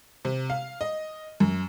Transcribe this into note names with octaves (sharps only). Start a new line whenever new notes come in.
C3
F5
D#5
F#2